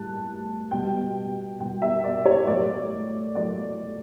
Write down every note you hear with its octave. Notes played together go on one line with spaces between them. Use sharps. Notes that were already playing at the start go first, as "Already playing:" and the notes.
Already playing: A2 G3 A5 F#6
B2 G3 G5
B2 G3 G5
E5
D5
C#5
A2 F#3 A3 D5
A2 F#3 A3 D5